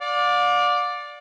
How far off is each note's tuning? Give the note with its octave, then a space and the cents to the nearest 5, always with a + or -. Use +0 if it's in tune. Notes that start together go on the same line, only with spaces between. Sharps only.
D5 +0 F5 +45